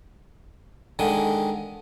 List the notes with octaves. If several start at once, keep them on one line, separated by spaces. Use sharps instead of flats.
D3 D#3 G#3